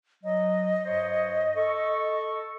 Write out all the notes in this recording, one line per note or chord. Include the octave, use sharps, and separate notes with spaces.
F#3 D#5
G2 C5 C#5
A4 C#6